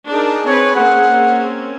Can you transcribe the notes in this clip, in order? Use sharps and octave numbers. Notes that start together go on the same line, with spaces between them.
D4 D#4 G#4 A#4
C4 B4 C#5
A#3 C4 C#4 F#5